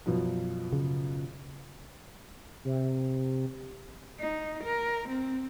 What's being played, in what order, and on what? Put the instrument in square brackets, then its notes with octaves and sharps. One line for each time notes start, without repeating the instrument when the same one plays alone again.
[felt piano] F#2 B2 F3
[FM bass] C#3
[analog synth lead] C3
[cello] D#4
A#4
C4